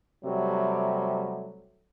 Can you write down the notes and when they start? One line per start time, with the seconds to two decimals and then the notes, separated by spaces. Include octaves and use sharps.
0.25 C3 F#3 G3 A3